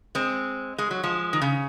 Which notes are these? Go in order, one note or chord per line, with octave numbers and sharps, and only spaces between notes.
G#3 C4
G#3
F#3
F3 G#3
D#3
C#3